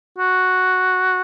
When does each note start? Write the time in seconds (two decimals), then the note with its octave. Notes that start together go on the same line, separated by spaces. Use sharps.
0.18 F#4